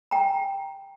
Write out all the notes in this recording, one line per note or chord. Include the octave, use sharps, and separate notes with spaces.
G5 A#5